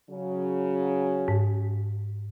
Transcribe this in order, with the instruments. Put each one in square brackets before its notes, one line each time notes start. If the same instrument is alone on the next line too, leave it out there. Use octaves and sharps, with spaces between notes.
[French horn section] C#3 F#3
[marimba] G#2